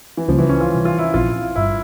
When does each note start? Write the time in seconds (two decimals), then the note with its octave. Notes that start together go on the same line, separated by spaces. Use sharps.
0.17 E3
0.28 C#2 C#3 F3 G3 A#3 C#4
0.38 E3
0.49 C#4
0.61 F4
0.71 C3 E3 G3
0.85 F4
0.99 E4
1.14 A#1 A#2 F3 C4 E4 F4
1.56 G1 G2 G3 E4